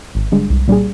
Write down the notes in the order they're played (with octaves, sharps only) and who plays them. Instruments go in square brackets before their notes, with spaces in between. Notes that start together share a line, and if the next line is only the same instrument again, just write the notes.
[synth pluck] G#1
G2 D3 G#3
C2
A#2 G3 D4 G#4